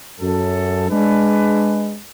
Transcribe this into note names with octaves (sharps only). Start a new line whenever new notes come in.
F#2 A4
G#3 D4 B4